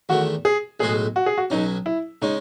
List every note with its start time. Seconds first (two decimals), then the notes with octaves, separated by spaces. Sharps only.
0.09 E2 D#3 A3 F#4
0.45 G#4
0.80 B1 A2 G#3 D#4 F#4 G#4
1.16 F#4
1.26 G#4
1.38 F#4
1.50 B1 B2 F#3 C#4 D#4
1.86 E4
2.22 C#3 G#3 C#4 D#4